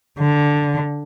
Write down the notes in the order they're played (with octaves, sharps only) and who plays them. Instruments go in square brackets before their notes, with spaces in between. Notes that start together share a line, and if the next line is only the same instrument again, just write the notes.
[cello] D3